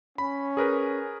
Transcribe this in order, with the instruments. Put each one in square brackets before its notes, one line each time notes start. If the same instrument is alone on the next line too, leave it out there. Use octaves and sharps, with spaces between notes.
[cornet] C#4 [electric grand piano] B5
[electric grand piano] G#4 A#4 B4